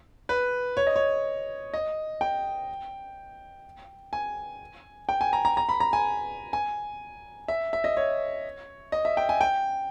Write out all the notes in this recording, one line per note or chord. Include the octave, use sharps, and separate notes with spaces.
B4
C#5
D#5
C#5
D#5
G5
G#5
G5
G#5
A#5
A#5
A#5
B5
A#5
G#5
G#5
E5
E5
D#5
C#5
D#5
E5
G5
G#5
G5